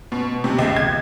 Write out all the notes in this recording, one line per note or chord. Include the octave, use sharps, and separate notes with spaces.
B2
C3
C#2
G#6